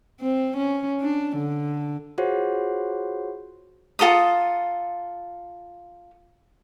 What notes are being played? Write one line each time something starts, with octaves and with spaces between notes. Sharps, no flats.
C4
C#4
D4
D3
F4 F#4 G#4 C5 C#5 F#5
F4 A4 A#5 D#6